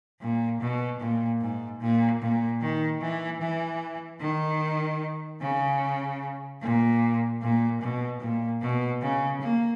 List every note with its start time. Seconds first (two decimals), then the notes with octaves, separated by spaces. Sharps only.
0.21 A#2
0.61 B2
1.00 A#2
1.41 G#2
1.81 A#2
2.21 A#2
2.62 D#3
3.01 E3
3.41 E3
4.21 D#3
5.41 C#3
6.62 A#2
7.42 A#2
7.81 B2
8.21 A#2
8.61 B2
9.02 C#3
9.41 A#3